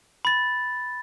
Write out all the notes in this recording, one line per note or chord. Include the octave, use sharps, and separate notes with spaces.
B5 A6